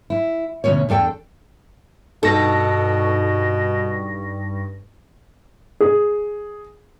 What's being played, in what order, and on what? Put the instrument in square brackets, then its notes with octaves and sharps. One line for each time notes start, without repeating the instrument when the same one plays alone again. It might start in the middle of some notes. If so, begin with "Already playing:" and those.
[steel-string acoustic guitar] E4
D2 B2 E3 F#3 C#4 C#5
E2 D4 A4 G5
[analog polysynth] G2 [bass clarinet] B2 [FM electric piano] D#4 C#6 A#6 [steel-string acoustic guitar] A4
[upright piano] G#4